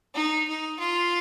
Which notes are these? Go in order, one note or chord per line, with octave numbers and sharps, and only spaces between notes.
D#4
D#4
F4